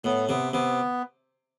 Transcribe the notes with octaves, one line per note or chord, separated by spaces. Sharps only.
A2 B3
C3 B3
C3 B3